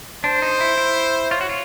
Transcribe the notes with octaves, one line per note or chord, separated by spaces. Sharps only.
D4 C5
D#4
E4
E4
F4 C#5
F#4
F4